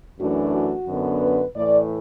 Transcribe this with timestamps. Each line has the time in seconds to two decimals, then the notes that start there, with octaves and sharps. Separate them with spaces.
0.19 F#2 E3 A3 D4 F#4
0.53 F#4
0.87 F#2 D3 B3 D4
1.21 B4
1.55 A2 E3 A3 D5